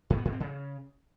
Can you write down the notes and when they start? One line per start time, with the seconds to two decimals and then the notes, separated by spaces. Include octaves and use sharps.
0.10 G#2
0.18 B3
0.25 G#2
0.33 C4
0.40 C#3